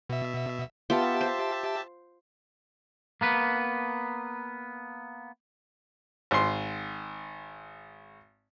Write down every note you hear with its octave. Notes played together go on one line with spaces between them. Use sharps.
B2 E5
B3 F4 G4 E5 G5 A5
C5
A#3 B3 B4
G#1 C6